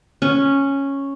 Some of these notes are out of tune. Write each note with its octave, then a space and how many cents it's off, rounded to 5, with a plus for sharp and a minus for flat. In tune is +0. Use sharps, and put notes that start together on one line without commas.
C#4 -5